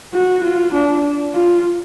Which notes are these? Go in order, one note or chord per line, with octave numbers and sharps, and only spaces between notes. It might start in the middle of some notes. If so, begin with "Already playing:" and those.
F#4
F4
D4
F4